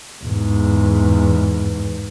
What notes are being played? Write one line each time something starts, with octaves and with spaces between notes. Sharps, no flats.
E2 G#2